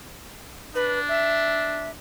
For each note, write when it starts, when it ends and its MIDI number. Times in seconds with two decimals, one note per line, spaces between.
0.75 1.97 62
0.75 1.00 71
1.09 1.90 76